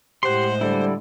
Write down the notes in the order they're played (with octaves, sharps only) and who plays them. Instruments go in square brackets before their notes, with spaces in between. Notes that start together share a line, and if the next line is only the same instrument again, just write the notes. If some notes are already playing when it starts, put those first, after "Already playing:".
[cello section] A2 G#3 [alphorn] G4 [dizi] C5 [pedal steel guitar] F#5 C6
[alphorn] D3 [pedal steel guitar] G3 E4